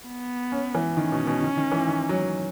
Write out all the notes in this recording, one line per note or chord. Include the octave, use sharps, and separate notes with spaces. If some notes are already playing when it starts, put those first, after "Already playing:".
B3
C#4
E3
D#3 C#4
B2
B2
D#3
D#3
E3
D#3
F#3